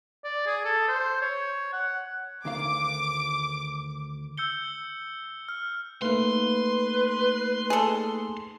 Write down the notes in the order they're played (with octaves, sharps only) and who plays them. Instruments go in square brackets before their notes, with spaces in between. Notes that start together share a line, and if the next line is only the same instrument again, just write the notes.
[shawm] D5
G#4
A4
C5
C#5
F#5
[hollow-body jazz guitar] D2 D#3 F5 [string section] D6
[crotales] E6 G6 C#7 G7
F6
[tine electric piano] A3 A#3 D#4 [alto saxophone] B4 [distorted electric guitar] C6
[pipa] G#4 A4